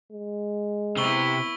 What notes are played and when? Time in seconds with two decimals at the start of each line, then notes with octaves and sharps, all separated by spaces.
0.12 G#3
0.97 C3 B3 E4 C#6 E6 G7